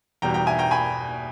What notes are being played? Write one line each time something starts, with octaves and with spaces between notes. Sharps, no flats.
E2 B2 G3 G5 A#5
G5 A#5
E5 G#5
G5 A#5
G#5 B5